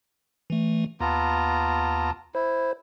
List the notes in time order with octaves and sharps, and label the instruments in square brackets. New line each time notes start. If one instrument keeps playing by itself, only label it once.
[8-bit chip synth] E3 A3
[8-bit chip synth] D#2 A5 [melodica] B3 F4 A#5
[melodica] E4 [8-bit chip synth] C5